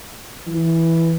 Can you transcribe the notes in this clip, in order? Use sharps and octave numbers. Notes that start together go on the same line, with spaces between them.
E3